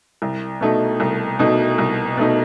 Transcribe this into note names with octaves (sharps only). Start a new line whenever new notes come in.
C2
B2 A3 D#4
C2
B2 A3 D#4
C2
B2 A3 D#4